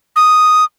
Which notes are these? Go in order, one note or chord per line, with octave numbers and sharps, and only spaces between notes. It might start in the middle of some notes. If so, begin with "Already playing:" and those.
D#6